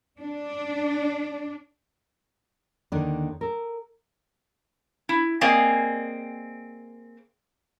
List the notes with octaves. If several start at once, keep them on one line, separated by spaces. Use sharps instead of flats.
D4
D#2 D3 D#3 D4
A4 A#4
E4
A#3 C4 G#4 D5 D#5 G#5